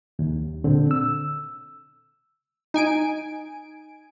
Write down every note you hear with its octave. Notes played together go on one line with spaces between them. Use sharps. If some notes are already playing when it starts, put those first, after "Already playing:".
D#2
A#2 D3 C4
E6
D#4 G#5 D7